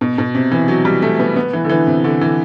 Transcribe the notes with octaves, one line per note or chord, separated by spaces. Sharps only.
B2
B2
C3
E3
F#3
G3
A3
B3
B3
E3
D3
E3
C3
D3
E3